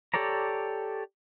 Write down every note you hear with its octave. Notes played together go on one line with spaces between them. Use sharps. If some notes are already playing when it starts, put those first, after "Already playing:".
G4 A4 C#5 D5 A#5